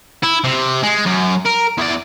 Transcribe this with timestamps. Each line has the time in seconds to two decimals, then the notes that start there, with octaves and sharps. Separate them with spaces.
0.23 E4
0.44 C3
0.83 G#3
1.06 F#2
1.45 A#4
1.78 E2 D5